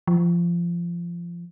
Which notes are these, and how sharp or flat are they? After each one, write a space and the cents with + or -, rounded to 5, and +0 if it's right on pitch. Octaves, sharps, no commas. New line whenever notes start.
F3 -20